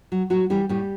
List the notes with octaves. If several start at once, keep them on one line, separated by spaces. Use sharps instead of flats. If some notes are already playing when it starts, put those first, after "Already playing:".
F#3
A2 F#3 F#4
E3 G3 G4
A2 G3 G4